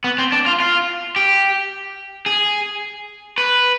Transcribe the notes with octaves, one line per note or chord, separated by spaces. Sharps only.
B3
C4
D4
F4
F4
G4
G#4
B4